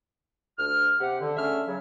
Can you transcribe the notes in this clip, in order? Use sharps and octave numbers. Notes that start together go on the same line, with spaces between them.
D2 F6
C3 G4 F#5
D3
D3 A3 C#4 G#4 E5 F6
C#3 F#3